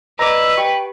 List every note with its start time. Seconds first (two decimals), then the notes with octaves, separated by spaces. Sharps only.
0.19 B4 D5 D#5 A#5 D6 E6
0.57 G4 G5 C#6